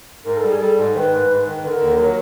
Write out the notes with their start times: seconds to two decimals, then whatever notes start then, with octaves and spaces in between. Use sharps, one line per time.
0.25 G#2 A#4
0.37 A4
0.42 G3
0.48 G#4
0.60 G3 A4
0.77 G#2
0.94 D#3 C5
0.99 B4
1.12 G#2
1.29 G#2
1.46 D#3
1.63 D3 B4
1.68 A#4
1.80 D#2
1.98 F#3